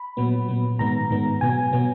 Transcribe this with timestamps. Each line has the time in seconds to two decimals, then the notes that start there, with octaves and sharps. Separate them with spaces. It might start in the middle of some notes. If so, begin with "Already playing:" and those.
Already playing: B5
0.17 A#2 F#3 B3
0.48 A#2 F#3 B3
0.79 G#2 D#3 G#3 B3 A#5
1.10 G#2 D#3 G#3 B3
1.41 B2 F#3 B3 G#5
1.72 B2 F#3 B3